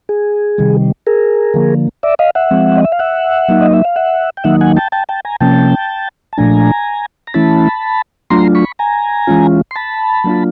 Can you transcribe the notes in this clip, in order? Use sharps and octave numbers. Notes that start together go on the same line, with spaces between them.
G#4
C3 D#3 G3
G#4 A#4
D3 F3 A#3
D5 E5
D#5 F5
E5 F#5
F3 G#3 C4
D#5
E5
F5
E5 F#5
F#3 A#3 D#4
D#5
E5
F5
E5 F#5
G5
D#3 F#3 A#3 D#4 E5 F#5
F#5 G#5
G5 A5
G5 A5
G5 A5
G#5 A#5
C3 F3 A#3 C#4 G5 A5
A5
A#2 F3 A3 D4 G#5 A#5
A#5
E3 A3 C#4 E4 A5 B5
F#3 A3 D4 F4 A#5 C6
B5 C#6
G#5 A#5
E3 G#3 C#4 F4
C6
A5 B5
F#3 A#3 D4 F4